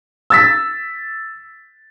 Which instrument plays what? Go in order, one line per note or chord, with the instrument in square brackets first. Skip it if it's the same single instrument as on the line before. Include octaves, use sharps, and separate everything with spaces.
[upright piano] E6 A6 B6